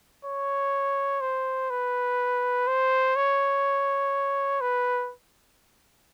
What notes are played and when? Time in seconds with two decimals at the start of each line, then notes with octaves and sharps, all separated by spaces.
0.25 C#5
1.21 C5
1.70 B4
2.67 C5
3.16 C#5
4.61 B4